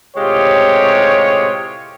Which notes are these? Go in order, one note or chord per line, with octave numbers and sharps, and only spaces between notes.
A2 C3 G#3 F4 G4 C#5